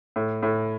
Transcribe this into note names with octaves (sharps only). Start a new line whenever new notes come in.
A2
A2